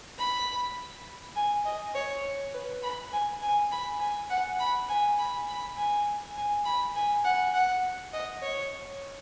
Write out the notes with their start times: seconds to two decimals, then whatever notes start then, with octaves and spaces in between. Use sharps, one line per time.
0.18 B5
1.36 G#5
1.65 D#5
1.95 C#5
2.54 B4
2.83 B5
3.12 G#5
3.42 G#5
3.71 B5
4.00 G#5
4.30 F#5
4.59 B5
4.89 G#5
5.18 B5
5.48 B5
5.77 G#5
6.36 G#5
6.65 B5
6.95 G#5
7.24 F#5
7.53 F#5
8.13 D#5
8.42 C#5